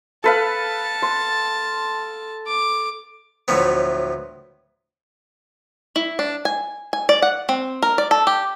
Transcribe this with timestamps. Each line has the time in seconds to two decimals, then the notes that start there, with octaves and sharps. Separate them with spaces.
0.24 A4 B4 F5 A5
1.02 C6
2.47 D6
3.48 D2 A2 F3 F#3 B3
5.96 E4
6.19 D4
6.45 G#5
6.93 G#5
7.09 D5
7.22 F#5
7.49 C4
7.82 A#4
7.98 D5
8.11 A4
8.27 G4